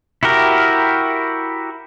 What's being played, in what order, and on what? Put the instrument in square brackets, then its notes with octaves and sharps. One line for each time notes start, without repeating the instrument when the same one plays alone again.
[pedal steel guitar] E4 F#4 G4 A#4